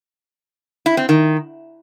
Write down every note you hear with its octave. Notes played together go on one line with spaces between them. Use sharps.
E4
C4
D#3